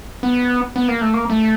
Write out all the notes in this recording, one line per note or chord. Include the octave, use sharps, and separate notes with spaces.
B3
B3
A#3
A3
A#3
A3